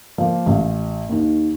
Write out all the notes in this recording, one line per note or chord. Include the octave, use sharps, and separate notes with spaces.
F3 A#3
A1
D#2 D#3